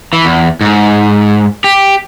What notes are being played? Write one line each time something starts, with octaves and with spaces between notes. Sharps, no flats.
E3
E2
G#2
G4